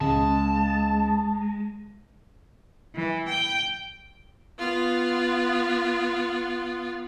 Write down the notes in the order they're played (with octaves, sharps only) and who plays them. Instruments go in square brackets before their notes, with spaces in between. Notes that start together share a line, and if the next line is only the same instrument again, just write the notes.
[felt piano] C#2 [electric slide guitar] G#3 [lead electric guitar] A5
[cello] E3
G5
[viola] B3 F4